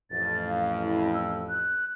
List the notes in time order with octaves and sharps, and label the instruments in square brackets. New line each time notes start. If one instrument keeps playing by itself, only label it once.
[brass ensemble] A1 F2 [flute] A6
[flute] F5
E4
E6
F#6